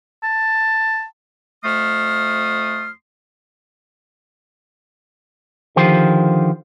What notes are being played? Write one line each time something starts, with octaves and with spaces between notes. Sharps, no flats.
A5
F2 A3 C6 D#6 F6
D3 D#3 F3 G4 C5